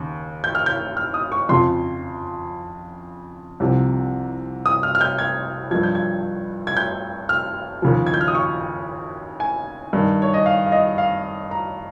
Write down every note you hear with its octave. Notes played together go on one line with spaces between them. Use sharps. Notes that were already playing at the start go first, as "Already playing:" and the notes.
Already playing: D#2 C#3
G6
F6
G6
F6
D#6
C#6
F2 C#3 F3 C6
C2 C3 F3
D#6
F6
F6
G6
G#6
G2 F3 G#6
G6
G#6
G#6
G6
F6
D#2 C#3 F3
G#6
G6
F6
D#6
C#6
G#5
G2 D#3
C#5
D#5
F5
F5
D#5
F5
A#5